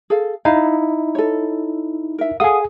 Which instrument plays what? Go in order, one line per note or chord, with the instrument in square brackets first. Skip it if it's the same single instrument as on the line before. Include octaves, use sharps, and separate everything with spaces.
[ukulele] G#4 A4 F5
[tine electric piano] D#4 E4 [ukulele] F5
[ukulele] A4 C#5
A#4 E5
[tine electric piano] G#4 D#6 [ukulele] A4 F5 F#5